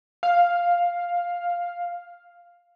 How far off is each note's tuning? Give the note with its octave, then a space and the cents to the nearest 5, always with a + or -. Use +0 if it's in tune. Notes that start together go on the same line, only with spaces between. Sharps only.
F5 +5